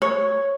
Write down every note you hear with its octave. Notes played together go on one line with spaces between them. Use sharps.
C#5